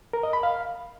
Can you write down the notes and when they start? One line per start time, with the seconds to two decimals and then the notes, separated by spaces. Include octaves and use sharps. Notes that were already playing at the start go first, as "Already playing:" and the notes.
0.13 A#4
0.23 D#5
0.33 B5
0.43 F5